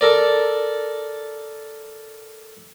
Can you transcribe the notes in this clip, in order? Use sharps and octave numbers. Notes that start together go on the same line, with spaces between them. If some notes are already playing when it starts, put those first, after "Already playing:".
A4 A#4 D5